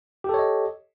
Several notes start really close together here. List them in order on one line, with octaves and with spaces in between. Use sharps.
G4 A4 C#5 D#5